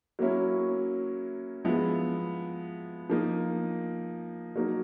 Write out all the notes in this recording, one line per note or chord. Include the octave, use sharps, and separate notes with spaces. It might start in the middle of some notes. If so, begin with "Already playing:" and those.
F#3 A#3 C#4 E4
F3 G#3 B3 E4
F3 A#3 D#4
F#3 A#3 D#4